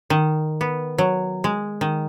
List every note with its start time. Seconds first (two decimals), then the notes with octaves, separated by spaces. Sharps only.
0.10 D#3
0.61 B3
0.98 F#3
1.44 G#3
1.81 D#3